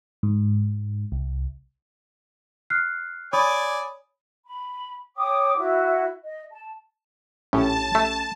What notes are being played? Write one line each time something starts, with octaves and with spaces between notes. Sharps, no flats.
G#2
C2
F6 F#6 C7
C#5 D5 G#5 B5 D#6
B5
C#5 G5 D6 D#6
E4 F#4
D#5
A5
A#1 A2 C#4 G4 A5
A3